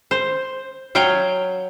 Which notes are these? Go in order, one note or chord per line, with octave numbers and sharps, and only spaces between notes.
C5
F#3 C#5 F5 G5